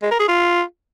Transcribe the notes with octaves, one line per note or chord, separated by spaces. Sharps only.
G#3
A#4
G#4
F4